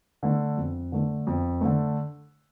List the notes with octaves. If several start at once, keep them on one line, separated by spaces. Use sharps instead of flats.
D3 A3
F2
D3 A3
F2
D3 A3